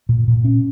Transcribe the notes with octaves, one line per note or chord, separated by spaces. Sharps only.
A#2
A#2
C#4